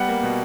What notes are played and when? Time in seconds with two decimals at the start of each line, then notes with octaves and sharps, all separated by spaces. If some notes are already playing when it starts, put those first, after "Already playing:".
Already playing: G3 B3 F#5
0.08 A#3
0.23 B2